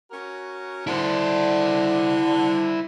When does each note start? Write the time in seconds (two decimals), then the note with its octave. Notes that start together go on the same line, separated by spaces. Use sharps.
0.11 C#4 F#4 A#4
0.87 D3 E4 C5